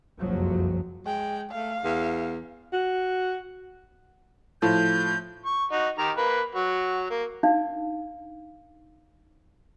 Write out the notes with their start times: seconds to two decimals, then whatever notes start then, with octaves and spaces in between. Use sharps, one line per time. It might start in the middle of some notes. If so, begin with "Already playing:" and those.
0.20 F#1 C2 F2 F3 F#3
1.06 G#3 G5
1.52 A3 F5
1.84 E2
2.73 F#4
4.62 A2 F3 G6
5.46 C#6
5.72 D#4 F#4
5.98 D#3 G4 A#5
6.17 A#3 B4
6.55 F#3 F#4
7.10 A#3
7.43 D4 D#4 F5